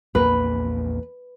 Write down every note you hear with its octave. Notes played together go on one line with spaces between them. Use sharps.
A#1 E2 A#3 B4